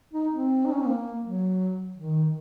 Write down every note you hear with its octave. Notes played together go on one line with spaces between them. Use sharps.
D#4
C4
D#4
C#4
C4
A#3
F#3
D#3